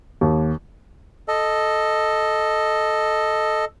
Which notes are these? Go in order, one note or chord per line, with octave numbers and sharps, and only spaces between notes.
D#2
A4 D#5